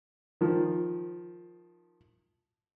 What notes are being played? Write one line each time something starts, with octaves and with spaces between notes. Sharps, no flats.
D#3 F3